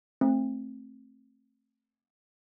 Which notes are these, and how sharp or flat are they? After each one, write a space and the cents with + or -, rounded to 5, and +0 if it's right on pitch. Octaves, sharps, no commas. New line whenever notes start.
A3 +5 C4 +20